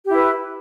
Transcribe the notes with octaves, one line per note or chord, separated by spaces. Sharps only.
E4 G4 B4